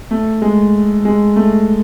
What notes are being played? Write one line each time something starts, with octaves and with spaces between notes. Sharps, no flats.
A3
G#3
G#3
A3